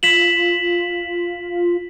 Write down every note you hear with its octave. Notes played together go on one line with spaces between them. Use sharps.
F4 B6 E7 F#7